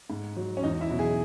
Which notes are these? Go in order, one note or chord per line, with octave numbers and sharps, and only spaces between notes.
G#2
F#3
C#4
E2 D#4
E4
B2 F#3
G#4